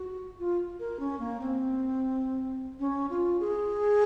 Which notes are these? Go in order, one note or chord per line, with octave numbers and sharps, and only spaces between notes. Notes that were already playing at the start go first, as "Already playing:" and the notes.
Already playing: F#4
F4
A#4
C#4
A#3
C4
C#4
F4
G#4